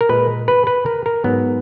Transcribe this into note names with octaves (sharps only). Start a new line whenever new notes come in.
A#4
A#2 G#3 B4
B4
B4
A#4
A#4
G#2 F#3 B3